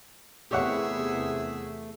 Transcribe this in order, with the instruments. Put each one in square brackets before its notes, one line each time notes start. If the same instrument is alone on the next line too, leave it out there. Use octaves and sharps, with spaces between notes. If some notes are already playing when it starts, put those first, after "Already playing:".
[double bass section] E2 C3 [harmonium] A3 [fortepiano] G4 C#5 F#5 [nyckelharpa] G#4 E5